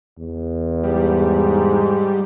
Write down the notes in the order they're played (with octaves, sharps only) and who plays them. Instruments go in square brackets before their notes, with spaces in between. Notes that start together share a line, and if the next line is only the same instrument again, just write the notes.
[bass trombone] E2
[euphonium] G#2 [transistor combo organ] G3